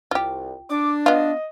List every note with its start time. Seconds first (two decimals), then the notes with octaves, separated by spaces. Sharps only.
0.11 C2 F4 G4
0.70 D4 D6
1.06 B3 F4 D#5